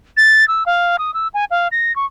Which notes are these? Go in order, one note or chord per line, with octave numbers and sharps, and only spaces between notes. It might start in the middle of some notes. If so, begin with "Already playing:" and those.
A6
E6
F5
D#6
E6
G#5
F5
A#6
C#6